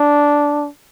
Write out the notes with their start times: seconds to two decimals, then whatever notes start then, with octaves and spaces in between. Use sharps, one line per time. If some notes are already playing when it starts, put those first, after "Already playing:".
Already playing: D4